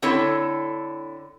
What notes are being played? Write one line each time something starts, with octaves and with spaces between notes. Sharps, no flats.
D3 C4 E4 A4 C#5